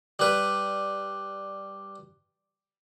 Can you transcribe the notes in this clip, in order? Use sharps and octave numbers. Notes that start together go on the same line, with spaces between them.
G3 B4